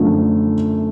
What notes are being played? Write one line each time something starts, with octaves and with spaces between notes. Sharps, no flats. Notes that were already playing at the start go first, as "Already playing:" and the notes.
Already playing: F#2 D3 F3 A3